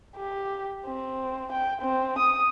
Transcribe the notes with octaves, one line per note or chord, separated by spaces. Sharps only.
G4
C4
G5
C4
D#6